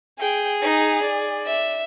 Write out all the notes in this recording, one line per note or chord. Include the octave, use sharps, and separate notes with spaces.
G#4 G5
D#4
D5
E5